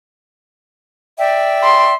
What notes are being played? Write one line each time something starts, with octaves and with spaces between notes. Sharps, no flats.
D5 E5 G5
C6